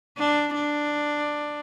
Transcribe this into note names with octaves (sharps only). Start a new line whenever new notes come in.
D4
D4